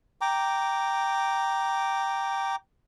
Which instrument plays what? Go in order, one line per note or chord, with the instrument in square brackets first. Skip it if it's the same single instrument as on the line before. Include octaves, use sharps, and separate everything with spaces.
[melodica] G5 A#5 D6